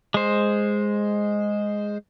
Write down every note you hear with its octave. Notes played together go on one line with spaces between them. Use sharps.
G#3 C5